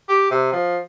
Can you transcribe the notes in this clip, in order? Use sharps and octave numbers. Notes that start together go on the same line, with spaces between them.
G4
C3
F3